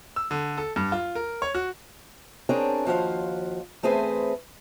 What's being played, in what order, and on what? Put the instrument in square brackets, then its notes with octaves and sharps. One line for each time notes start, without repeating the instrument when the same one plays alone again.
[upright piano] E6
D3
A4
G2
F4
A#4
C#5
F#4
[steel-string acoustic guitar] C4 D4 G#4 A#4 C#5
D#2 F3 F#4 C5 F5
E2 A3 C4 G#4 B4 C5